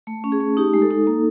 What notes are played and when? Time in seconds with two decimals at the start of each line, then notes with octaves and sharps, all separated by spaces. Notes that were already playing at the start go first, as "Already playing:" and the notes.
0.07 A3
0.24 C#4
0.32 G#4
0.40 A3
0.57 D#4 G4
0.74 G#3
0.82 A4
0.90 D#4
1.07 A#3